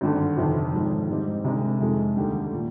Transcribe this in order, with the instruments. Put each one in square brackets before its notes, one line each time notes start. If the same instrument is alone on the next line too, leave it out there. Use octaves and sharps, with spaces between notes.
[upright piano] G#1 G2 D3
G1 F2 C3 D#3
G#1 G#2 F3
G#2 G3 C4 D#4
C2 C3 D#3 G#3 D4
F2 C3 D#3 G#3
D#2 D3 G3
A#2